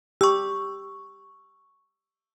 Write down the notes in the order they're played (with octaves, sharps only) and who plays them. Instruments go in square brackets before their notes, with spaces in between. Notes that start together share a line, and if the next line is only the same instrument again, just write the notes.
[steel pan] G4 [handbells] C#6 E6